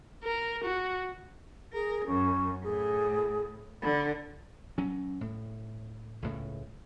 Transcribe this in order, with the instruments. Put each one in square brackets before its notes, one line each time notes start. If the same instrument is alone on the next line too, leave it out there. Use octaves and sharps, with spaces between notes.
[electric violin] A#4
F#4
[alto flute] G#4 [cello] A#4
[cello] F#2 [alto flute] C#4
[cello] A2 [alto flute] G#4
[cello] D3 [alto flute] B5
[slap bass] F#3 C#4
A2
C#2 A2 C#3